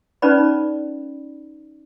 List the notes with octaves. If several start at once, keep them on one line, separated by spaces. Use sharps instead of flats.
C#4 D#4 B4 D5 B5